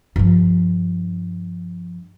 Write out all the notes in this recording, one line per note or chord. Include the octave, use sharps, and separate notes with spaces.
G2 F3